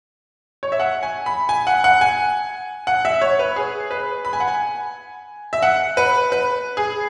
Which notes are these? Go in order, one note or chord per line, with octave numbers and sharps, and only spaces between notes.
C#5
E5
F#5
G#5
B5
G#5
F#5
F#5
G#5
F#5
E5
C#5
B4
G#4
B4
B5
G#5
F#5
G#5
E5
F#5
B4
B4
G#4